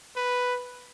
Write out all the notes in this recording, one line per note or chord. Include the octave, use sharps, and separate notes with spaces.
B4